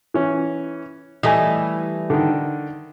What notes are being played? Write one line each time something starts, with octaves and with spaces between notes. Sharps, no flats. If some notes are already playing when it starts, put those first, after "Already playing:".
E3 C#4
E3 G3 A3 D#5 G#5
D3 D#3